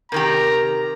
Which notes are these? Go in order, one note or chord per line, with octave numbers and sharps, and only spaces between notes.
C3 D#3 G4 A#4 A#5